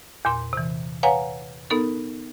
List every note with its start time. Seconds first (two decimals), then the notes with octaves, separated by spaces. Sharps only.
0.25 E2 A#2 C6
0.53 C3 E3
1.03 B4 C#5 F5 F#5 G#5 A#5
1.70 B3 D#4 A4 A#4